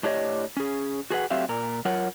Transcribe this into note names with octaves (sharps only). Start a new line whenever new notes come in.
A2 D4 G4 C#5 D#5
C#4 G#4
F#4 G#4 B4 F#5
F#3 A3 C4 G4 E5 F5
A#2 A#4
F#3 F4 A#4 C#5 F#5